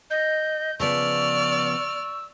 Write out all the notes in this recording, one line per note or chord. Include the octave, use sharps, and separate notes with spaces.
D#5 G6
C#3 F3 B3 D5 C#6 E6 F6